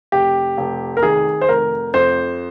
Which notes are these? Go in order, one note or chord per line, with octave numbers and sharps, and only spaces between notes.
F1 G4
F1
A#4
D#3 G#4
C5
F1 A#4
F2 C5